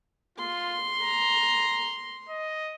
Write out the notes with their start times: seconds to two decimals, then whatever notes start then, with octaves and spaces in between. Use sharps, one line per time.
0.38 F4 C6
1.00 A#5
2.29 D#5